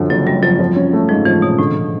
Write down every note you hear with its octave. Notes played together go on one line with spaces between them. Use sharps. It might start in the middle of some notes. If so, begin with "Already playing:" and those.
Already playing: F#2 D3 F3
F#1 F#3
F#2 G3
F3 F#3
F3
C#4
A3
G#2 F3
E3 F3
B2 C#4
A2 D3